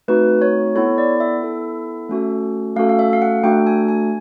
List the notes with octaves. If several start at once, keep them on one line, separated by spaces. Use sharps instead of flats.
A3 C4 D#4 F#4 B4
C#5
B3 E4 A4 C#5
D5
E5
B3 E4 A4
A3 C#4 F#4 A4
A3 C#4 F#4 A4 F5
F5
E5
F5
F#5
A3 D4 F#4 A4 G5
G#5
G#5